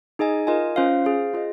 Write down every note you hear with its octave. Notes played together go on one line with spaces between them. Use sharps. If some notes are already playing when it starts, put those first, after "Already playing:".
D#4 G#4 D#5 G#5
F4 A#4 D#5 G#5
C#4 F4 C5 F5
G#4 C5 F5
F4 G#4 D#5